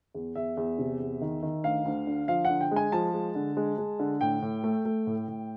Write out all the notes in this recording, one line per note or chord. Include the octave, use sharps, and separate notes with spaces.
E2
E2 E5
E2
C3
E2
D#3
D#3
D2 F5
D2
D3
F3 F5
F#5
D3
G5
G#3 G#5
F3 A5
G#3
D3
G#3
G#3
D3
A2 G5
A2
A3
A3
A2
A2